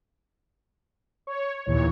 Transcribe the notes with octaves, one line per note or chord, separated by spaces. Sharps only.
C#5
D#2 A#2 E3 C#5